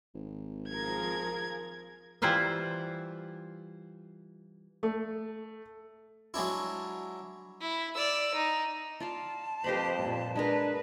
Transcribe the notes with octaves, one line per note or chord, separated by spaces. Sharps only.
G#1
F3 G#4 A#4 G#6
E3 G3 E4 F4 C5 E5
A3
F#3 G#3 D4 E4
E4
D5 E6
D#4
F4 D5 F5 A5
F2 G4 B4 C5 D#5 B5
A#2
G#3 D4 G#4 A#4 B4